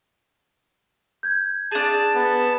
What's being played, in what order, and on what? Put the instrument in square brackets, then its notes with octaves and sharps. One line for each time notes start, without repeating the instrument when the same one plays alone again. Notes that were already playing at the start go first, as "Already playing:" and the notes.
[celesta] G6 G#6
[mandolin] D4 G#4 [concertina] A5
[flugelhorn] B3